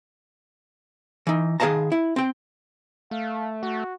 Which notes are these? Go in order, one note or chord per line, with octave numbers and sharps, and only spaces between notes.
E3 D#4
D#3 G#4 D5 F5 A5 A#5
E4
C4 G5
A3 F5
A3 F#4